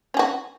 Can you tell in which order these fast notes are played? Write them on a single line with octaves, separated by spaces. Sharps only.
C#4 G#4 F#4